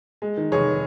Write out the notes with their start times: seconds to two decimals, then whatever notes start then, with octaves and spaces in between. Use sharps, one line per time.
0.22 G#3
0.37 D#3
0.52 F1 G#4 C#5